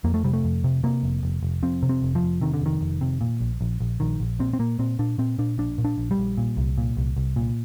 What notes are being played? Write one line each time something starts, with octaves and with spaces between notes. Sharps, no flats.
F2 A#3
A3
C3 G3
A3
F2
C3
C3 A#3
F1
F1
F1
F2 C4
C3
C4
F1
F3
F1
C3 D#3
D3
F1 D#3
F1
C3
A#2
A#1
A#1
A#1
A#1 D#3
A#1
A#2 C4
C4
A#2 A#3
A#2 C4
A#2 D4
A#2 C4
A#2 D4
A#1 D4
A#2
D4
A#1
G3
A#1
A#2
C2
A#2
C2
C2
A#2